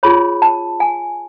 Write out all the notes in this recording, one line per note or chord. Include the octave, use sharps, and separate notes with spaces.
F4 G#4 C#5 B5
A5
G#5